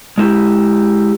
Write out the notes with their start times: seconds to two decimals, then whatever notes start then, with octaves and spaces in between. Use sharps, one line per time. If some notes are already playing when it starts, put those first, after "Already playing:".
0.18 G#3 E4 G4